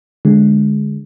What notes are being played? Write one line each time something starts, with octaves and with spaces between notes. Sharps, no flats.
D3 G#3